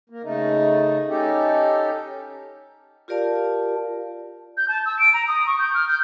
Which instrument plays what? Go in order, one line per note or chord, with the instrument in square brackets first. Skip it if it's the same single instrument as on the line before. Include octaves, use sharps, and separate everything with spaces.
[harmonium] A#3
C#3 A3 D#4
C#4 D#4 G4 A4
[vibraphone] F4 G4 A#4 D5 F5 A5
[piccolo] G6
A5
E6
D7
A#5
D#6
C#6
G6
F6
G6